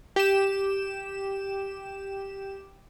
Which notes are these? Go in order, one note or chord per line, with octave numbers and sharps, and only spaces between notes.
G4 E7